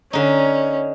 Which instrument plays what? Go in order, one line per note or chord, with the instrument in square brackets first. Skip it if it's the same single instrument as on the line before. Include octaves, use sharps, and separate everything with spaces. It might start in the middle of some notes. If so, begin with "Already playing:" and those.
[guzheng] D3 D#4 [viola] C#4